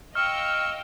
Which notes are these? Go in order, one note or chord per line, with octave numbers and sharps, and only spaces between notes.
D#5 F5 G5 C#6 E6 F6